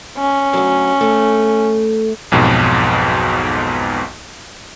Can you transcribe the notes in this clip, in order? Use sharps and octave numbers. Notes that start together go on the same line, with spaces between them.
C#4
D2 F#3
A3
B1 F2 G#2 B2